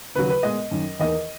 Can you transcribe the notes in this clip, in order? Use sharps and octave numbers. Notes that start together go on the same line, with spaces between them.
D#2 C#3 F#3 B4
B4
A#2 G#3 B3 D#5
F#2 D#3 A#3 C#4
E2 D#3 A#3 D#5